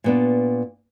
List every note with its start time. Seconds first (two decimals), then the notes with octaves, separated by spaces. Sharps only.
0.04 A#2 B3 D4